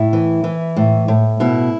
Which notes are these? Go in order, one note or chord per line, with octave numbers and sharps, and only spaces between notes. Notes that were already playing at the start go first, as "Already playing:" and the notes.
Already playing: A2 E4
E3
E3
A2
A2
B2 E4